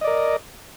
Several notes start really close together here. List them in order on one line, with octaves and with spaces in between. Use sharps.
D#5 D5 A#4